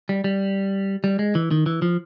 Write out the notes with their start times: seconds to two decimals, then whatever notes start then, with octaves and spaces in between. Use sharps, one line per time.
0.09 G3
0.24 G3
1.04 G3
1.19 G#3
1.35 E3
1.51 D#3
1.66 E3
1.82 F3